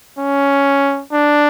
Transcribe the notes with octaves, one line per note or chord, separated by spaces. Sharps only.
C#4
D4